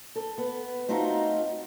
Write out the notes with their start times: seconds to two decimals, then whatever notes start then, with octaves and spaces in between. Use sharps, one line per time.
0.16 A4
0.38 B3
0.89 A3 C4 D#4 F4 F#4